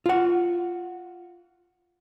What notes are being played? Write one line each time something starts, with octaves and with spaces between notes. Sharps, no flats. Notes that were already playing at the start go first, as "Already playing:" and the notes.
F4 F#5